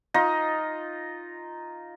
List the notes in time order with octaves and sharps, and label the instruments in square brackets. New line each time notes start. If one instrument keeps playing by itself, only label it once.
[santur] D#4 F4 D#5